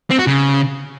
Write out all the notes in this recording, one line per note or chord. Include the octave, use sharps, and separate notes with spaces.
C4
F#4
C#3